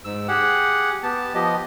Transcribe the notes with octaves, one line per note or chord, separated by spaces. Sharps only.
G#2 E6
G4 G#4 F#5
B3 G4 A5
F3 B3 G4 D#5